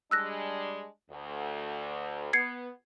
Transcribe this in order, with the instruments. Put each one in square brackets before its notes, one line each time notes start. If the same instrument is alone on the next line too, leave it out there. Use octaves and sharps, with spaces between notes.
[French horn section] G3 G#3 D4 [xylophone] E6 F#6 A#6
[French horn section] D2
[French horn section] B3 [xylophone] G#6 C7 C#7